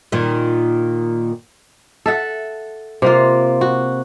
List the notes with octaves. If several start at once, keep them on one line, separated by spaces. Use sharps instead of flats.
A#2 D#3
A4 E5 F#5
C3 A#3 F4
F#4